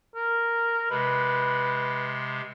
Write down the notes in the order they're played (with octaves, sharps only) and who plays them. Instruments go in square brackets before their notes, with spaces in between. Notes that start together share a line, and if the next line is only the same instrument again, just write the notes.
[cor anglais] A#4
[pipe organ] C3 G#3 [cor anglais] B4